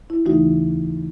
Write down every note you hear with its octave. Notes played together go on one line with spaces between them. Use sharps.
E4
D#2 C#3 E3 A3 D#4 F#4